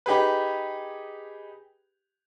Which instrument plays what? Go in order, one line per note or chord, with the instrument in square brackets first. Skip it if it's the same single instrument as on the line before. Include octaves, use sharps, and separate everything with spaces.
[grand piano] D#4 G4 G#4 B4